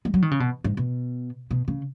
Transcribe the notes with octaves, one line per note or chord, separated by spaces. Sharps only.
G#3
F#3
D#3
C#3
B2
G#2
B2
B2
C#3